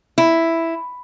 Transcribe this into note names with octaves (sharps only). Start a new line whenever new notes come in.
E4